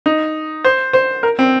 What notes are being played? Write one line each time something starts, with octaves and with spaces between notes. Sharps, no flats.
D#4
C5
C5
A#4
C4